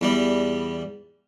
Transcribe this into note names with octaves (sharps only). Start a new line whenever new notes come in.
E2 G3